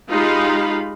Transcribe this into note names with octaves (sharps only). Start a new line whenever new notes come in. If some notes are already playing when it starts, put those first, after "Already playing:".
G#3 D#4 F4 G4 F5 B5